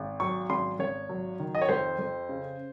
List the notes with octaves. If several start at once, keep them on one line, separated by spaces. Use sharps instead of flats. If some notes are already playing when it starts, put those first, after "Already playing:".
Already playing: G#1
F#3 C#6
G#1 C6
G#1 C#5
F#3
D#3
D#5
C#5
F2 C5
F2
C#3